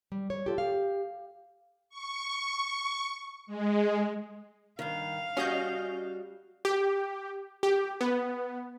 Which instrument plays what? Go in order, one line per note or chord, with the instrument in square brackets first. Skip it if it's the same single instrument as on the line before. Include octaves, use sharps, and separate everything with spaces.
[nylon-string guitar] G3
C#5
[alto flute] F4 [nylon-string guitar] G4 A4
[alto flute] G4 [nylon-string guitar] F5
[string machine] C#6
G#3
[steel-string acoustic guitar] G2 D#3 [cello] F5
[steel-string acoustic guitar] G3 F#4 [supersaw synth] C#4 D#5 G6
[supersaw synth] G4
G4
B3